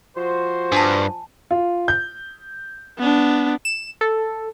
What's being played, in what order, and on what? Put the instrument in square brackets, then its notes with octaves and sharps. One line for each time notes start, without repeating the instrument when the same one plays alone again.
[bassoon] F3 [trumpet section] F#4 C5
[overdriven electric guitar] G2 [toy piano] G#5 A5
[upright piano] F4
G6
[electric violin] B3 D4
[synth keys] E7
A4